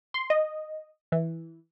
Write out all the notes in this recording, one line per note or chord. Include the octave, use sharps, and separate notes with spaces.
C6
D#5
E3